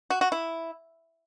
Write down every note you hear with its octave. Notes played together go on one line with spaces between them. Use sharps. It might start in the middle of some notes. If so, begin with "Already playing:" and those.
F#4
F#4
E4